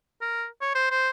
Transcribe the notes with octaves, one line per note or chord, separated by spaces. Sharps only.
A#4
C#5
C5
C5